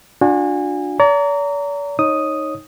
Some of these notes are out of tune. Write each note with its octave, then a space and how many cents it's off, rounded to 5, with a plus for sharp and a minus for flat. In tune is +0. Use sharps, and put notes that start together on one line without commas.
D4 +5 F#4 -40 G#5 -25
D5 -45 A#5 -15
D#4 +0 C#5 -20 D#6 +0